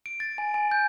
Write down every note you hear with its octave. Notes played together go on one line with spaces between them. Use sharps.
D7
A6
G#5
G#5
G6